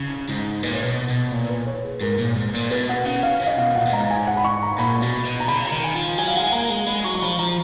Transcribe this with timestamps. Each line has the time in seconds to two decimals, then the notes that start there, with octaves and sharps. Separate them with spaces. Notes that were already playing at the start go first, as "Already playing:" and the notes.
Already playing: C#3
0.29 G#2
0.63 A#2 B4
0.73 C#5
0.83 B4
0.86 B2
1.10 B2
1.32 A#2
1.49 B4
1.67 C#5
1.84 G#4
2.02 G#2 A#4
2.19 A#2
2.36 G#2
2.54 A#2
2.71 B2 B4
2.89 F#5
3.06 C#3 F#5
3.23 F5
3.41 C#3
3.47 D#5
3.58 B2 F5
3.75 A#2 F#5
3.87 A#2
3.93 G#2 A#5
4.11 G#5
4.27 F#5
4.37 B5
4.44 C#6
4.63 A#5
4.79 A#2 B5
5.02 B2
5.25 B2
5.40 A#5
5.48 C#3 B5
5.66 A#5
5.72 D#3
5.84 G#5
5.95 F3
6.18 F#3 G#5
6.28 F5
6.36 G#3 F#5
6.44 G#5
6.52 A#3 A#5
6.70 G#3
6.87 G#3 B5
7.04 F#3 C#6
7.15 C#6
7.22 F3 B5
7.39 F3 A#5